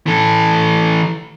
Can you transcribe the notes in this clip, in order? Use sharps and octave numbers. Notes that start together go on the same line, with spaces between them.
E3 A4